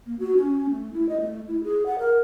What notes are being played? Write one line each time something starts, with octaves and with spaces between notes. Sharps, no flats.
A#3
F#4
C#4
A3
E4
D#5
A3
E4
G#4
F#5
A#4